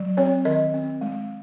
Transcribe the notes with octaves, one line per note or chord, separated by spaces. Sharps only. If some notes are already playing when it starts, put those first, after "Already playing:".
Already playing: F#3
C4 C#5
D#3 D#5
C4
G#3